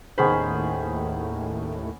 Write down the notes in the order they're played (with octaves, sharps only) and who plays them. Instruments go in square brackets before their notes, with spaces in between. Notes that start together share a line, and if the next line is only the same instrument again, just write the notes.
[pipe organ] D#2 A2 [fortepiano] D#3 G#4 C5 [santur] B3 C#4 B5